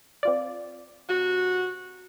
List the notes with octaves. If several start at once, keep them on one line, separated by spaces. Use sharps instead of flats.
C4 F4 D5
C3 F#4